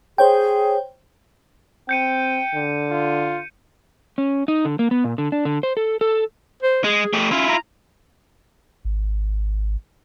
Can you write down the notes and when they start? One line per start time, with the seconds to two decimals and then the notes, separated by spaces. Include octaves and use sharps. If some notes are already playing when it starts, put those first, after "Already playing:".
0.18 G#4 C5 C#5 G5
1.89 C4 G5 G6 C#7 D#7
2.55 D3
2.90 F4
4.18 C#4
4.48 D#4
4.65 D3
4.79 A#3
4.91 B3
5.04 A#2
5.18 D3
5.32 D4
5.45 D3
5.63 C5
5.77 A4
6.01 A4
6.63 C5
6.84 G#3 G#4
7.13 A3 G4
7.31 C#4 E4 F4
7.49 A#5
8.85 G#1